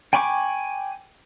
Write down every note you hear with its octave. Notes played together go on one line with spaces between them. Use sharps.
G5 G#5 B5 C#6 D6